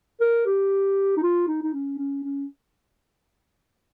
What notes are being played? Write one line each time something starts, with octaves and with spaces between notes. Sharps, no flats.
A#4
G4
D#4
F4
D#4
D#4
C#4
C#4
C#4